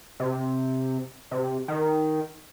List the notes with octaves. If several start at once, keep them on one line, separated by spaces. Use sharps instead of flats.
C3
C3
D#3